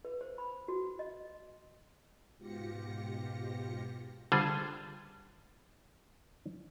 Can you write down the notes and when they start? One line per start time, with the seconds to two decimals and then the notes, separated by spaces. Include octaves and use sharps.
0.05 B4
0.21 C5
0.38 B5
0.68 F#4
0.99 D#5
2.37 G#2 B2 F4 G4 A#6 C#7
4.32 D3 G3 F4 G#4 C5